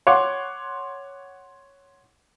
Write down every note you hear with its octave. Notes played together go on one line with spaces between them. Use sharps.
C#5 F#5 C6 D6